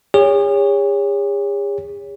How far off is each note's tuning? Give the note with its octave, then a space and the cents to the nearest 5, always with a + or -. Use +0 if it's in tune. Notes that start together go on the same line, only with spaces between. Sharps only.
G#4 -45 C#5 +15